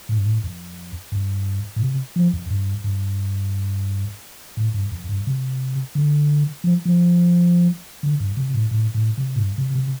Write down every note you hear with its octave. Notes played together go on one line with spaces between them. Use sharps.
A2
G2
A2
F2
G2
A2
C3
F3
F2
G2
G2
A2
G2
F2
G2
C3
D3
F3
F3
D3
G2
C3
A2
A2
A2
C3
A2
G2
C3
C3